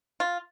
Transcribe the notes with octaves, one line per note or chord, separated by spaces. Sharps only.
F4